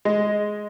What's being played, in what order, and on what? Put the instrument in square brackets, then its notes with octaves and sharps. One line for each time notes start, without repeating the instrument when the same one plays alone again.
[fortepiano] G#3